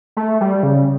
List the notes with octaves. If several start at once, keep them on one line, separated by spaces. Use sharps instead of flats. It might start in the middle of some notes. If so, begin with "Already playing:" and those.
A3
G3
C#3